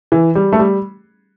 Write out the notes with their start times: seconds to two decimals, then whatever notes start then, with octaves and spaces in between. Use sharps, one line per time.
0.12 E3
0.35 G3
0.52 A3
0.59 G3